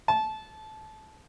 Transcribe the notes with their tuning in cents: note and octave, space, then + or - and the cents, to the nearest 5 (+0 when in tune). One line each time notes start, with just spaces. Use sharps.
A5 -20